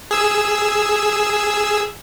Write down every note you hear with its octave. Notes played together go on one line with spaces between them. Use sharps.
G#4 E6